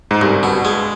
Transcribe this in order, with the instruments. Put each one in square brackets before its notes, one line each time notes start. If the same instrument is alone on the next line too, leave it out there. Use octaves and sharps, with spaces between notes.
[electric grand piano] G#2
[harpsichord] C2 [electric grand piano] G2
[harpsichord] B2
G#3